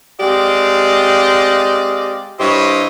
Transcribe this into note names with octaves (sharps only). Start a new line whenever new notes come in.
G#3 C4 G4 D5 D#5 F5
G2 E4 G4 C5 C#5 D#5